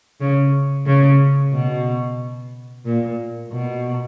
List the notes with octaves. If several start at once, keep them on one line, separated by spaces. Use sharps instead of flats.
C#3
C#3
B2
A#2
B2